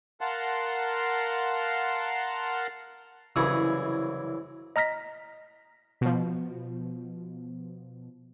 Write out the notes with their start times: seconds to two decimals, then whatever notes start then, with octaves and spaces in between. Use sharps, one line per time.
0.21 A#4 F5 F#5 A5 C6
3.36 C2 F#2 C#3 E3 G#4 F#5
4.76 D#5 A#5 F6 A#6 B6
6.01 B2 F3